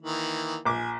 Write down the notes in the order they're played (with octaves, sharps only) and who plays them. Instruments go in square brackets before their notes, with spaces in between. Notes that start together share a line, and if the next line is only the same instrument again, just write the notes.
[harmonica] D#3 E3 A#3
[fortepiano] A#1 D6 [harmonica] G#5